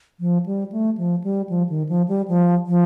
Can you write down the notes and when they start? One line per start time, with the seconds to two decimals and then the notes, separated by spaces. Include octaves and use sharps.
0.20 F3
0.46 G3
0.72 A3
0.97 F3
1.24 G3
1.49 F3
1.69 D#3
1.89 F3
2.08 G3
2.28 F3
2.67 F3